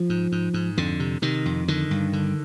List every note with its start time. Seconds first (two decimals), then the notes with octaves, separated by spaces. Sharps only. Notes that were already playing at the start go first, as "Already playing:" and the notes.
Already playing: F3
0.09 G#2
0.32 G#2
0.54 G#2
0.77 F2 D3
1.00 C3
1.22 C3 D#3
1.46 F2
1.68 D3 D#3
1.91 G2
2.13 D3